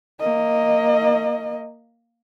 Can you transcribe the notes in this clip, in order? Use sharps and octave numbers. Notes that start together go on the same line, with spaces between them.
A#3 D#5